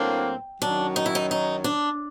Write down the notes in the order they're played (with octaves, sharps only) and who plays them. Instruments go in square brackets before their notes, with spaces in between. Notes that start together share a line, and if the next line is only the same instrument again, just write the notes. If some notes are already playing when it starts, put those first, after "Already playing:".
Already playing: [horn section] A2 F#3 A#3 D4 [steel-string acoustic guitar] C4
[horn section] F#2 D#3 F#3 [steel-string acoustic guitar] D4
[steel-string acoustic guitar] D#4
E4
D#4
D#4
D4